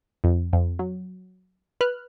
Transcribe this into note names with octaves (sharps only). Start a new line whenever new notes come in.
F2
F2
F#3
B4 F6 F#6